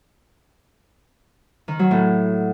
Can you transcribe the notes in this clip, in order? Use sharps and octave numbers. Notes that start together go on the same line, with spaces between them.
D#3
F#3
A2